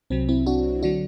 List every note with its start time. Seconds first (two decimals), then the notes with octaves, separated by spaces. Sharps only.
0.10 C2 C3 F#3 C4
0.29 C4 E4
0.46 D4 F#4
0.83 D3 F#3 D4 F#4